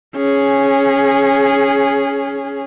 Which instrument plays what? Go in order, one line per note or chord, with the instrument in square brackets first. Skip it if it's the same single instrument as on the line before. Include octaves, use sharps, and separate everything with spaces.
[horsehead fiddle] C#4 G#4